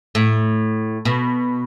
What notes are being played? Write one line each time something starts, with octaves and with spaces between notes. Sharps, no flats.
A2
B2